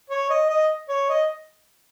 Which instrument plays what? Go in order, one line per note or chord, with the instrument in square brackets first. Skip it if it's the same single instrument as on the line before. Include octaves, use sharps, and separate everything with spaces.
[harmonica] C#5
D#5
D#5
C#5
D#5